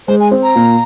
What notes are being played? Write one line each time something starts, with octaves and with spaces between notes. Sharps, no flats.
G#3 C5
G#5
C4
A#5
A#2